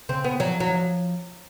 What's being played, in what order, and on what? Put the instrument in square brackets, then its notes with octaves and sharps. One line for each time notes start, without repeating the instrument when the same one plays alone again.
[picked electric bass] C#3 [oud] C4
[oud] B3
[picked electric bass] F3 [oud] F#3
[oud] F#3
[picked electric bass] F3